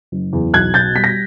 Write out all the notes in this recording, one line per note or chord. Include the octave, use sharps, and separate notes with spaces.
F#1
E2
B1 F#6 G#6
B2 G6 A6
G3 B6
A#6